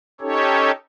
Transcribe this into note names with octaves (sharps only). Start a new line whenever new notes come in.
C#4 D#4 G4 A4 C#5